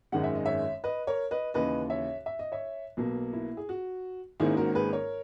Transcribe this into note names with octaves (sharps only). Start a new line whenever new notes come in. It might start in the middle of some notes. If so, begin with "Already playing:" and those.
G#1 F#2 D#3 G#3 F#5
E5
D#5
C#5 E5
B4 D#5
A#4 C#5
B4 D#5
D#2 C#3 E3 B4 D#5
C#5 E5
E5
D#5
C#5 E5
B1 B2 A#3
E4
G#4
F#4
G#1 G#2 D#3 A#3 C#4 E4 G#4
F#4 A#4
G#4 B4
A#4 C#5